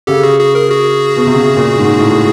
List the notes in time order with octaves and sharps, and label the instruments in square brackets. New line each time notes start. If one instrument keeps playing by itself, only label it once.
[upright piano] C#3 [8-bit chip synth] G4 A4
[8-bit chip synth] F#4 G#4
F#4 G#4
G#4 A#4
F#4 G#4
[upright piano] B2
C3
C#3
A#2
G#2
A2